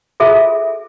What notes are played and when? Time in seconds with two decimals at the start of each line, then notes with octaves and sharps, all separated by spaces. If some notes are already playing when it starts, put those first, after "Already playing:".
0.20 F4 G#4 A4 E5